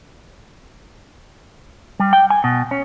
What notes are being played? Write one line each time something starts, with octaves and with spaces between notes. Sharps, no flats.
G3
G5
G#5
B2
C#4